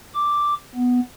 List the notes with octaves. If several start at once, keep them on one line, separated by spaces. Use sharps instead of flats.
D6
B3